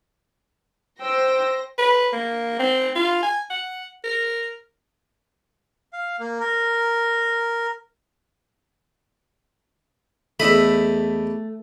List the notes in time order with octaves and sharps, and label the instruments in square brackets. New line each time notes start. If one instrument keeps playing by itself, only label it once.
[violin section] C5 A#6 [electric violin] G5 E6
[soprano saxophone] B4
A#3
C4
F4
G#5
F#5
A#4
[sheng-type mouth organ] F5
A#3
A#4
[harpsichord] E2 D#5 B5 [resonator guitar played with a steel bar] A3